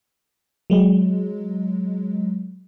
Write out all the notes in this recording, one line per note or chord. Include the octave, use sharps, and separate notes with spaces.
F#3 G#3